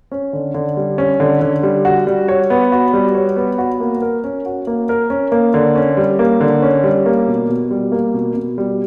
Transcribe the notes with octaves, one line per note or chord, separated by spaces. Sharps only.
C#4
D3
D3
G3
C#4
D3
D3
G3
F#4
G3
C#5
B3
F#4
G3
C#5
B3
F#4
A#3
A#4
C#4
F#4
A#3
A#4
C#4
A#3
D3
C#4
G3
A#3
D3
C#4
G3
A#3
B2
B2
G3
A#3
B2
B2
G3